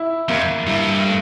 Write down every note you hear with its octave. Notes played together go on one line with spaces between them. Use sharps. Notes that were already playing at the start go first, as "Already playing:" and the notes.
Already playing: E4
F2 A#3
G2 E4
A3